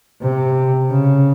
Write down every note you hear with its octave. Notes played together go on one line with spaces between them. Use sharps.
C3
C#3